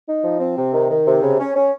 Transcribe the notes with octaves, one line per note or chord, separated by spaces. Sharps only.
D#4
F3
C4
C3
D#3
D#3
C3
C#3
C#4
C#4